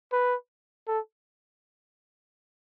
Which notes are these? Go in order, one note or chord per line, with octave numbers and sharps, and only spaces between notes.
B4
A4